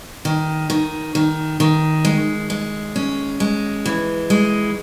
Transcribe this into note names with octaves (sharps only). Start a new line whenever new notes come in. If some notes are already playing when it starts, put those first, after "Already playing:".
D#3
D#3
D#3
D#3
G#3
G#3
C#4
G#3
E3
G#3